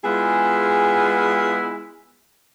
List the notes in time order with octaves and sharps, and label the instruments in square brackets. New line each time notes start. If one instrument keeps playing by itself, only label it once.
[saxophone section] G#3 B3 E4 F4 G#4